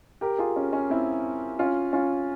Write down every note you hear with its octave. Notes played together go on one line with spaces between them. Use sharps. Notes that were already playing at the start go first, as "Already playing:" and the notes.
G4 A#4
F4 G#4
C#4
C#4
C4 E4
C#4 F4
C#4 F4